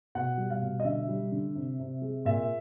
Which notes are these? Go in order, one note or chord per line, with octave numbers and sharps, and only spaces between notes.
B2 F#5
G3
F5
B2
D#5
D3 E5
G3
D3
C3
C3
G#3
A#2 E5